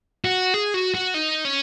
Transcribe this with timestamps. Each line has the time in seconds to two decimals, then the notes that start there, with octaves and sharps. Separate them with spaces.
0.25 F#4
0.54 G#4
0.74 F#4
0.95 F#4
1.14 D#4
1.45 C#4